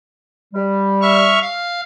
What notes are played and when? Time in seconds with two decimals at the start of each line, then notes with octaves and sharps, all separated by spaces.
0.54 G3
1.02 E5 C#6 F6
1.42 F5